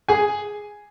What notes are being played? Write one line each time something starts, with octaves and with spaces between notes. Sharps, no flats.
G#4 G#5